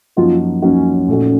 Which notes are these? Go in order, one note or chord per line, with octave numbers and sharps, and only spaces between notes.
F#2 F3 A#3 D#4 F4 F#4
F#2 F3 A#3 C#4 D#4 F#4
A#2 A3 D#4 F#4